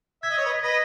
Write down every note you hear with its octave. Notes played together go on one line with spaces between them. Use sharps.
E5 G#6
D#5
C#5
B4 D#5
B6
B4 D#5 A#6